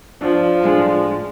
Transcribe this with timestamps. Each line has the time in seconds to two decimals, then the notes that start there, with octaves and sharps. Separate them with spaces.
0.21 F3 D4
0.62 A2 G#3 D4